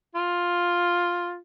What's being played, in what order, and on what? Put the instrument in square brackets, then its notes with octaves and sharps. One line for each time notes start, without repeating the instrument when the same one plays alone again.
[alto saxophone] F4